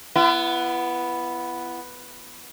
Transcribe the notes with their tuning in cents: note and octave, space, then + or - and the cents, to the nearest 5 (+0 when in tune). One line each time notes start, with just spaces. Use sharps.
B3 +0 E4 +40